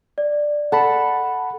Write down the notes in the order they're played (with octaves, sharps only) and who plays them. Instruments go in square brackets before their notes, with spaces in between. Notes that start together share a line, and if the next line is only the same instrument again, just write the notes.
[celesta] D5
[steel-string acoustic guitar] A4 [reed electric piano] F#5 A5 B5